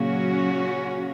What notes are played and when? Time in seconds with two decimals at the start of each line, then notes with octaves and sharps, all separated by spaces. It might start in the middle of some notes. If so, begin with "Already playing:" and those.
Already playing: A#2 C#3 F#3 C#4 F#4